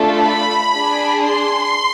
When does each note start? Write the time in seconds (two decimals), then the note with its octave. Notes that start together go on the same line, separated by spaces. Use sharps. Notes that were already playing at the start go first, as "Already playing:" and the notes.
Already playing: A3 D4 F4 A4
0.19 B5
0.73 D4 G#4
1.25 C6